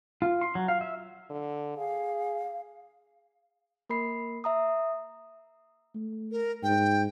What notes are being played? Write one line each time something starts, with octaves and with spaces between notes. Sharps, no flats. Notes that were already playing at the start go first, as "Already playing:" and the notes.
F4
C6
F#3
F5
E5
D3
G#4 F5
A#3 A#4 B5 C7
E5 A#5 D#6
A3
A#4
G#2 G5